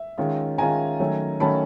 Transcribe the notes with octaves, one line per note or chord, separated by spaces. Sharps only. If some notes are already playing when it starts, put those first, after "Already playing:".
Already playing: E5
D#3 G#3 C#4 F4
D#3 G#3 C#4 F4 G#5 A#5
D#3 F#3 A3 C#4
D#3 F#3 A3 C#4 A5 B5